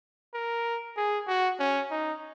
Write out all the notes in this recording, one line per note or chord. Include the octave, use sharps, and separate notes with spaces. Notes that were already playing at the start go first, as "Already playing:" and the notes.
A#4
G#4
F#4
C#4
D#4